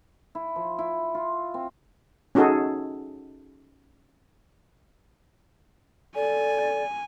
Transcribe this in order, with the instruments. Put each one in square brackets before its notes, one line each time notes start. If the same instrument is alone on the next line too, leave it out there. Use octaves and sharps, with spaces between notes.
[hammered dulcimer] E4
F3
E4
F4
C4
[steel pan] C#4 D#4 F#4 G#4 A4
[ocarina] A4 [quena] D5 [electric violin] G#5